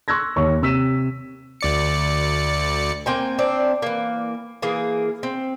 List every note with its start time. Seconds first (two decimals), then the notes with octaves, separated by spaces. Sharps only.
0.08 C6 C#6 E6 F#6 G#6 A#6
0.36 D#2 C#5 C#6
0.62 C3 E6 B6 D#7 E7
1.61 D2 D5 C#7
3.06 A#3 C4 G5 G#5
3.39 C4 D4
3.82 E3 A#3
4.62 E3 A#3 G#4
5.23 C4